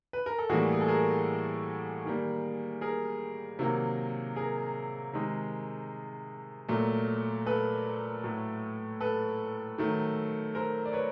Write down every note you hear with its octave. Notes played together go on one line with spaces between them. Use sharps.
B4
A#4
A4
A2 E3 G3 A#3 F#4 G#4
G#4
A4
G#4 A#4
D#3 G3 A#3
G#4 A#4
C3 D#3 F#3 A#3
G#4 A#4
C3 D#3 G#3
A#2 F#3 A3
A4 B4
A2 F#3 A3
A4 B4
D#3 F#3 A3
A#4 C5
D5
B4 C#5